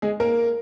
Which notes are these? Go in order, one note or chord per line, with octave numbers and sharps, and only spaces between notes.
G#3 G#4
A#3 A#4